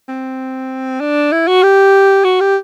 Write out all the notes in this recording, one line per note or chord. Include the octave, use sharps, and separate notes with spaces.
C4
D4
E4
F#4
G4
F#4
G4